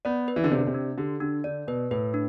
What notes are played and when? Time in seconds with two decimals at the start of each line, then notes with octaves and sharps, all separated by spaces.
0.05 B3 D5
0.28 B4
0.36 E3
0.44 D3
0.51 C3 D5
0.59 D3
0.67 C3
0.74 D4
0.98 D3 G4
1.20 D3 D4
1.44 D3 D5
1.67 B2 B4
1.91 A2 B4
2.14 D4